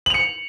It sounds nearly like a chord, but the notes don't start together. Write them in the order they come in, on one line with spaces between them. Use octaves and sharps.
F#7 F7 C#7